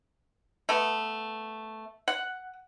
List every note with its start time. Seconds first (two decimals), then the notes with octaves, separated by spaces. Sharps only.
0.69 A3 B3
2.08 F#5